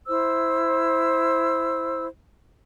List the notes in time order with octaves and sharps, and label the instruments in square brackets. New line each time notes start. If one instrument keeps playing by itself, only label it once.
[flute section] E4 C5 E6